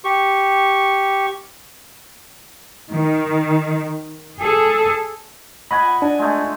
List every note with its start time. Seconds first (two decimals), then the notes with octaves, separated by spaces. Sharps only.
0.05 G4 C#6
2.90 D#3
4.39 G#4 A4
5.71 D#5 F#5 G#5 B5
6.02 D4
6.19 G#3 A3